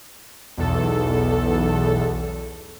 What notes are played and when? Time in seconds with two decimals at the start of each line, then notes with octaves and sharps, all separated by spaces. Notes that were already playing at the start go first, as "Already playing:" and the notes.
0.57 B1 E2 A4